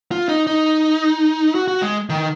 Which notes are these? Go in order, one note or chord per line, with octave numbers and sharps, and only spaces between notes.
F4
D#4
D#4
F#4
F#4
G#3
D#3